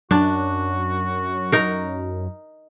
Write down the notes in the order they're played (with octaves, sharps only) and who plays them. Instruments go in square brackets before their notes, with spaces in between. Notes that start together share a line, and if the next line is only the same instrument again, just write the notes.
[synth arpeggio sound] F#2 [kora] D4 [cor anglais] F#4
[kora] D#4 A#4